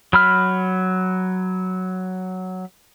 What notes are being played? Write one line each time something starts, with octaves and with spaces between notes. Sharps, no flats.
F#3 B5 F6